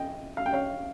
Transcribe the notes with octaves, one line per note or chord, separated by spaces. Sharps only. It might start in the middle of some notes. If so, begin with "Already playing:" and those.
Already playing: D#5 G5
F5
G5
C#5 F5